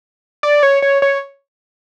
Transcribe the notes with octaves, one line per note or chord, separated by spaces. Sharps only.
D5
C#5
C#5
C#5